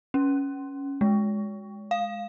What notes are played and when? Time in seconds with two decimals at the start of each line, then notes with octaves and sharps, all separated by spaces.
0.14 C#4
1.01 G#3
1.91 F5